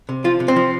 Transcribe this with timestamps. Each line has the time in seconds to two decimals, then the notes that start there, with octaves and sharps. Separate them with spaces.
0.09 C3
0.24 F3 F4
0.40 C3
0.48 C4
0.56 F3